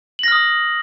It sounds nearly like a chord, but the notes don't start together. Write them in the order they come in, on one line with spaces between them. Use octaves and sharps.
F#7 A#6 F6 D#6